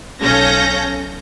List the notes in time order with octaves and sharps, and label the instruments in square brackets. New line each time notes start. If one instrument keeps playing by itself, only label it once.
[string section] B1 C#4 A4 F5 G6 A#6